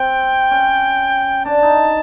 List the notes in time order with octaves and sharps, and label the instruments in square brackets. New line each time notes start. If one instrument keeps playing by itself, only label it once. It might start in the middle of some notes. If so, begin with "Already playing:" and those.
Already playing: [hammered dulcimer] C4 [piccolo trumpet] G5
[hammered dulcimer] C#4
[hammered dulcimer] D4 [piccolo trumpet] A5
[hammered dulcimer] D#4